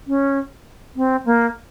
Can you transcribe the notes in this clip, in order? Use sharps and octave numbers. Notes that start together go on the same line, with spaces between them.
C#4
C4
A#3